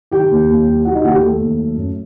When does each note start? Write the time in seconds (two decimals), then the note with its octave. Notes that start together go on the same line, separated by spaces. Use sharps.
0.11 D#3 G4 G5
0.31 D#2
0.49 D#2
0.67 G3
0.85 G3 F#4 F#5
0.95 D#4 D#5
1.03 D#2 F#4 F#5
1.12 G4 G5
1.22 D#2 A3 A4
1.41 D#2
1.59 F#3
1.77 F#2